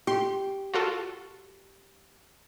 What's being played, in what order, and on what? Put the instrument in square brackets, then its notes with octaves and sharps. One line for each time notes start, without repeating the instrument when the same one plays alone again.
[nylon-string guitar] G4 [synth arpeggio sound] C6
[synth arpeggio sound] F4 F#4 A4